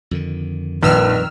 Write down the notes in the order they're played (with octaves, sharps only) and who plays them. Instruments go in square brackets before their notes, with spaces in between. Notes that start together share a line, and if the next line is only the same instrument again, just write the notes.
[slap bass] F2 D3 D#3
[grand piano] A#1 [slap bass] F2 A#2 G3 [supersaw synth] D#3 E6 F6 [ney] B4